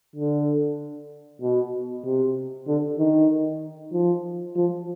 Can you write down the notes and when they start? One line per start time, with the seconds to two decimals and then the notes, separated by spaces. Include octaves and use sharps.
0.16 D3
1.42 B2
2.05 C3
2.67 D3
2.99 D#3
3.93 F3
4.56 F3